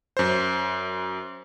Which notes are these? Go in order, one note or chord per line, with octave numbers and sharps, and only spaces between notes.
F#2 C5